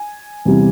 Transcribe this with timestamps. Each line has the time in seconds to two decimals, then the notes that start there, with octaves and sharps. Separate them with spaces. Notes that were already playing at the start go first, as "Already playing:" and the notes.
Already playing: G#5
0.45 E2 C3 G3